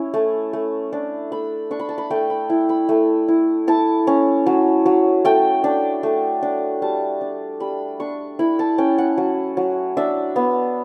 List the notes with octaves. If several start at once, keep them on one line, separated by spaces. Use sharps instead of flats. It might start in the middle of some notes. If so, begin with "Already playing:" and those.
Already playing: C#4 E4
A3
A3
D4
A3 B5
D4 C#6
B5
A5
B5
A3 G5
B5
E4
B5
A3
E4
E4 A5
C#4
F#3
F#3
A3 G5
D4
A3
D4
G3 A5
D4
G3 B5
D4 C#6
E4 B5
A5
C#4 G5
F#5
F#3
F#3
D4 E5
B3